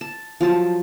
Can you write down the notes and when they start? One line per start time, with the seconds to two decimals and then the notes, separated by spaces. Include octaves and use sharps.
0.01 A5
0.41 F3 F#3 A5